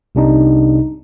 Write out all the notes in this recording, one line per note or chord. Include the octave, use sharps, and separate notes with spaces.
C2 C3 D4 D#4